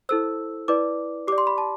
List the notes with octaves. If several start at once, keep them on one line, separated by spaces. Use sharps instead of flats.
E4 A4 C5 E6
E4 B4 D5 D6
G4 D5 D6
C6
B5
A5